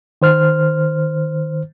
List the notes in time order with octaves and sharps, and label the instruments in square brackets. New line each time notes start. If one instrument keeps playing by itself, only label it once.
[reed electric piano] D#3 C5 F6